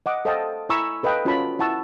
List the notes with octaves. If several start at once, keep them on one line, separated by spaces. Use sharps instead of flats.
D#5 F#5 D6
A4 C5 D#5 F5 G5 A5
E4 G#5 A#5 B5 C#6 E6
A4 B4 D#5 F5 G5
C#4 F4 F#4 C#5 A5 B5
E4 F#5 A5 C#6 E6